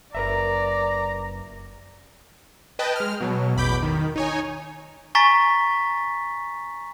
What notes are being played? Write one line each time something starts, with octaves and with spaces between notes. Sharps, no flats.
F#1 A#4 B4 D5 E5 A#5
B4 D#5 G5 A5
G#3 F6
B2 F#3
A1 E2 B2 B5 D6 G6
D#3
D#4 C#5 G#5
G#5 A#5 C#6 A6 B6